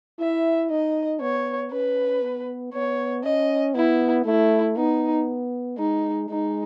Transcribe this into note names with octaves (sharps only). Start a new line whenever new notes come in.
E4 E5
D#4 D#5
B3 C#5
C#4 B4
B3
B3 C#5
C#4 D#5
B3 E4
A3 E4
B3 D#4
G#3 D#4
G#3 D#4